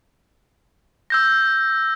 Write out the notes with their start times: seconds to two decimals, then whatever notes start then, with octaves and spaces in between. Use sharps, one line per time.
1.10 E6 G6 A#6